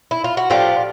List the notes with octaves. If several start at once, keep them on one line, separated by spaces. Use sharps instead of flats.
E4
F4
F#4
A2 F3 A3 D4 F4 G4